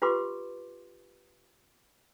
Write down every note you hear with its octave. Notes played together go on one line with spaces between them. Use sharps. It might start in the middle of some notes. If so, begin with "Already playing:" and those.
F4 G4 B4 C6 D6